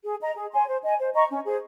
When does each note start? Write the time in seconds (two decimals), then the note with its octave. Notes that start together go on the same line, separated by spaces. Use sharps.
0.04 G#4
0.20 D#5 A#5
0.36 G#4
0.52 C#5 G#5 C6
0.67 C5
0.83 D#5 G#5
0.99 C5
1.13 D#5 A#5 C#6
1.29 C#4
1.45 G#4 C5